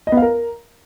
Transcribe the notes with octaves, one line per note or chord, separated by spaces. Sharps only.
D#5
B3
F5
A#4